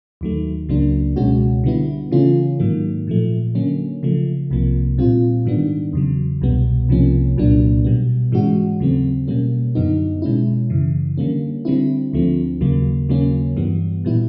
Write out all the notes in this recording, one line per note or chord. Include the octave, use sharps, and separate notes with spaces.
D#2 D#3 F#3 A3
C#2 C#3 F#3 A#3 D4
C#2 B2 G#3 C#4 F#4
D3 G3 B3 E4
C#3 E3 A3 C#4 F4
G#2 D#3 F#3 A#3
A#2 F3 A3
D3 F#3 A#3 C#4
C#3 F3 A3
C2 C3 F3 A#3
A#2 G3 C4 F4
G#2 D#3 G3 B3 D4
E2 C#3 F#3
C2 B2 G3 B3
C2 C3 F3 A#3 C#4
C2 A#2 F#3 A#3 D4
B2 G3 B3
G#2 E3 G#3 C#4 F#4
D#2 C#3 F#3 A3 C4
B2 G3 A#3 C#4
F#2 D3 F#3 B3 D#4
B2 G#3 C#4 E4
F#2 C#3 E3
D3 G3 A#3 C#4
D3 G3 C4 E4
D2 D3 F3 A3 C4
D#2 C#3 F#3 A#3
D#2 C#3 F#3 A#3 C#4
G2 E3 G3 B3
A#2 G3 B3 E4